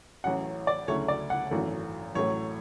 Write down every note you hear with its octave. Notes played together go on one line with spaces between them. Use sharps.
A1 A2 F#3 C#4 F#5
D5
D2 C#3 F#3 A3 E4 C#5
D5
F#5
G#1 F#2 E3 A3
A1 A2 F#3 A3 C#5